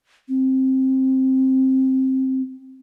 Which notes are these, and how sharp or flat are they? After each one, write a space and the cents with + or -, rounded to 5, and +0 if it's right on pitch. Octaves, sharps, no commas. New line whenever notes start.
C4 +10